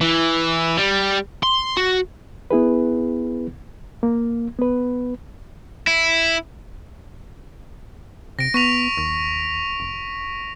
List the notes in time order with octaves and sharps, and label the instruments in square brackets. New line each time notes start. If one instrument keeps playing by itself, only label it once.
[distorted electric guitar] E3
G3
C6
F#4
[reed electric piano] B3 E4 G#4 B4
A#3
B3 B4
[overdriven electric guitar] E4
[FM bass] C3 [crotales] A#6 D7
[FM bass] B3 [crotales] C#6 B6 F7
[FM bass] D#2
F1